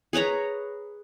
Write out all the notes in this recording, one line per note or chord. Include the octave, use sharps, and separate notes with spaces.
G#4 B4 C#5 A#5